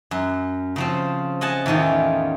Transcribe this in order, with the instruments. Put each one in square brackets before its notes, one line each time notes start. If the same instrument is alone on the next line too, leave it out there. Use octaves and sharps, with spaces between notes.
[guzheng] F#2
C#3 F3 C4
D#5 F#5 G#5 A5
E2 A2 D#3 C#4 F4